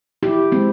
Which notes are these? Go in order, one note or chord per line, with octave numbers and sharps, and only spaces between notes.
E4 G4
G#3 C4